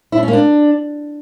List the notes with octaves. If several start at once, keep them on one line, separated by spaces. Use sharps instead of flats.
E4
D4
C#4
A#3
D4